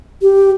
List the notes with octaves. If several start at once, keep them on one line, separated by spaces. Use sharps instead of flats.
G4